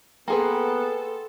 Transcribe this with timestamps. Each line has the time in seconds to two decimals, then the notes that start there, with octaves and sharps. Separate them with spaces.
0.28 A#3 B3 G#4 A4 B4 G5 G#5 C6